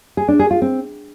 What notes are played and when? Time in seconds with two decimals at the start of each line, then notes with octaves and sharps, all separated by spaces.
0.17 G#4
0.28 D4
0.39 G#4
0.51 F4
0.62 C4